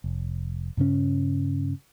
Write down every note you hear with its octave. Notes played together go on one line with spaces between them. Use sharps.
F1
G2 C#3 C#4